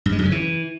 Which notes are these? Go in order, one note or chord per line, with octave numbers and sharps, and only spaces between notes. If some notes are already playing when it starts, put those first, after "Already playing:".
G2
G#3
F#2
C#3
E3